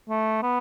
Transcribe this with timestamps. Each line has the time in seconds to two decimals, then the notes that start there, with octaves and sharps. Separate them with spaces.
0.09 A3
0.42 B3